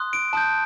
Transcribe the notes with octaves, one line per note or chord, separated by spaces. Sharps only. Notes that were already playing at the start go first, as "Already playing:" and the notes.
Already playing: C6 D#6 F#6
D7
A5 D#6 G6